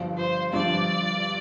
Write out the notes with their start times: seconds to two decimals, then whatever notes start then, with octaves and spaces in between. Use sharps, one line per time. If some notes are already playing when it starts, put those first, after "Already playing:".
Already playing: G1 G2 F3
0.18 C5
0.53 G1 G2 F3 D5